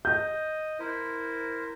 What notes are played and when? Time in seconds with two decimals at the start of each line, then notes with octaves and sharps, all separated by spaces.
0.05 D#5 G6
0.80 E4 A#4 C5